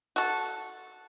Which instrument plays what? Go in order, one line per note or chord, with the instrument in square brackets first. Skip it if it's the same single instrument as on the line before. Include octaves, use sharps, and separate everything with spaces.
[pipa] F#4 A4